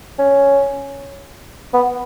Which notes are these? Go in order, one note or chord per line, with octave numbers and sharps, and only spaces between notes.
C#4
B3